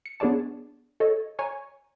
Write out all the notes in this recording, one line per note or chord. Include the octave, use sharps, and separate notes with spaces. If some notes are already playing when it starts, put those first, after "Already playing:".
C#7
B3 D4 G#4 C#5 D5 A5
A4 C#5 D#5
C#5 G#5 A#5 C#6